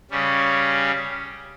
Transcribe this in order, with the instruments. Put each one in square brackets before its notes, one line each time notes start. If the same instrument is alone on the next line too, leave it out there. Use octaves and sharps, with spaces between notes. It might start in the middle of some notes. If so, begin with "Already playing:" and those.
[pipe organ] C#3 G3 C#4